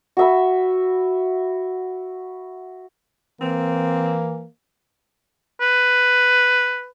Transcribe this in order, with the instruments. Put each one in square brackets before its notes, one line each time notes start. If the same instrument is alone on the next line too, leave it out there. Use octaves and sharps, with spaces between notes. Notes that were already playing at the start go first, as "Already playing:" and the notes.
[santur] F#4 E5 B5
[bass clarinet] E3 [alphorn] A#3 [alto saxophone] C4
[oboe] B4